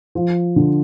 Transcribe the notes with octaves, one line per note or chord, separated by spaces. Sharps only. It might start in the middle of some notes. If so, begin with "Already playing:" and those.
F3
D3